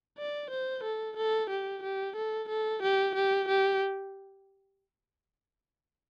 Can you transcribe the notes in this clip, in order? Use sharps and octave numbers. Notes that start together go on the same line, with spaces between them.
D5
C5
A4
A4
G4
G4
A4
A4
G4
G4
G4